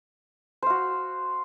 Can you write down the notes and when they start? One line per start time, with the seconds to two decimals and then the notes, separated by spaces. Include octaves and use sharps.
0.62 C5
0.66 F5
0.70 F#4